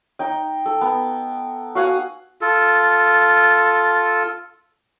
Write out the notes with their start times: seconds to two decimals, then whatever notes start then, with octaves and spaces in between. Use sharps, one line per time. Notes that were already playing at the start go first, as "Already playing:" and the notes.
0.19 D#4 G5
0.66 A4
0.81 B3
1.75 F#4 F5 F#5 G#5
2.41 F4 A4